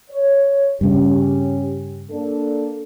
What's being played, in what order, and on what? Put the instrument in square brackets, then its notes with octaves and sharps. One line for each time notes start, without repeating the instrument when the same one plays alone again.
[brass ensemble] C#5
[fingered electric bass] G2 C#3 [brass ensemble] C#4 G4
[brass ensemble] A#3 D4 A4